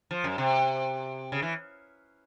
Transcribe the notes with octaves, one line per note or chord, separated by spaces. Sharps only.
F3
F#2
C3
C#3
E3